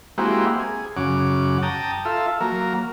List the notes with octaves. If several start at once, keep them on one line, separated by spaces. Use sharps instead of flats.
G#3 A#3 C4 E4 F#4 G4
G#4
F#2 C#3 F#5 D6
G5 A5 A#5 D#6
F4 A4 E5
F#3 A#3 A#4